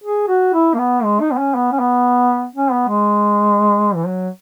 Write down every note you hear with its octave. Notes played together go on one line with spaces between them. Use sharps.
G#4
F#4
E4
A#3
B3
G#3
D#4
B3
C#4
B3
C#4
B3
C#4
B3
G#3
E3
F#3